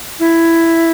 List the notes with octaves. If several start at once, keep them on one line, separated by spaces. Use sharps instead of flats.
E4